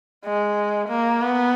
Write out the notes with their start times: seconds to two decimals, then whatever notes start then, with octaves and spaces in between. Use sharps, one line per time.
0.25 G#3
0.89 A#3
1.21 B3